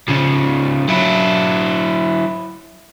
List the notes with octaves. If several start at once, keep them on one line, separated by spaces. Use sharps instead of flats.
C#3 F3
F#3 E4